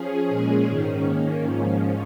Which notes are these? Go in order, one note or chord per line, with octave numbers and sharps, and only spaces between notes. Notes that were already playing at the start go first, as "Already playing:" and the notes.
Already playing: F3 C#4 G#4
A#2 G#3 C#4 G#4
G#2 D#3 C#4
D#3 A#3 C#4
G#2 F3 C#4